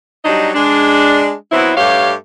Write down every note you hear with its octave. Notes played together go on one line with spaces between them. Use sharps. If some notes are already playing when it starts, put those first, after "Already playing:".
F#3 G3 D4 D#4 D#5
G#3 D4
F#3 B3 C4 E4
G2 A3 G4 C#5 F5